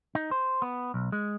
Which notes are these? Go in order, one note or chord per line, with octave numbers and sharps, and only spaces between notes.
D#4
C5
B3
B1
G#3